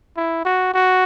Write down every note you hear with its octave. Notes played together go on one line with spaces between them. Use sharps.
E4
F#4
F#4